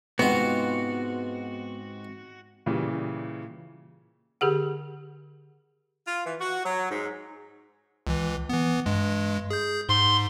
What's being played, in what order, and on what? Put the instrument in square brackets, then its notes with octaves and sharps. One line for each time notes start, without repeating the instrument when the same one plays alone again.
[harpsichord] G#2 C3 F4 [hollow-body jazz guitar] B3 [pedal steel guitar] F#4
[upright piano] A#2 C#3 E3 G3
[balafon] D3 G4 G#4 F#5
[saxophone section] F4
E3
F#4
F#3
G#2
[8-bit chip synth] C#2 E3
E3 B3
G2 G#3
G#4 G6
[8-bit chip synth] G#2 [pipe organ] C6